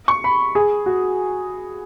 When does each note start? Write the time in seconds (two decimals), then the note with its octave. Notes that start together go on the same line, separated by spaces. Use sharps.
0.08 C#6
0.24 B5
0.55 G#4
0.86 F#4